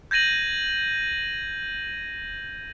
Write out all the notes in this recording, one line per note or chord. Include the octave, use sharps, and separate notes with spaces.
G6 G#6 A#6 D#7 F#7